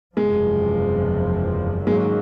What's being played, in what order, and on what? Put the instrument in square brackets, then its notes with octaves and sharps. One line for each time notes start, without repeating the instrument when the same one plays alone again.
[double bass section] F#1 E2 C3 F3 [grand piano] G#3
[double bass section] G#2 D#3 F#3 A#3 C#4 [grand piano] G#3